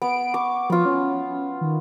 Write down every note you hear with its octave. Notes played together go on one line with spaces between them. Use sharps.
B3 D7
C#6 D6
F3 B3 F4
C#4
D#3